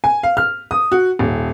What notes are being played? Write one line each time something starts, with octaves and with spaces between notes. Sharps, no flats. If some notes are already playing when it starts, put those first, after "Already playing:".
G#5
F5
F6
D#6
F#4
D#1